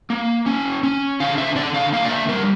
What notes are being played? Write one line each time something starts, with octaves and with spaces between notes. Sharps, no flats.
A#3
C#4
C#4
D3 F5
E5
D3 D5
F5
A#3 F5
D5
E5
G3 A#4